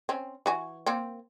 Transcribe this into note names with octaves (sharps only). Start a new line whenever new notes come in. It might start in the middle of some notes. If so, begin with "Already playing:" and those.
C4 C#4
E3 F#4 G#5
A#3 C4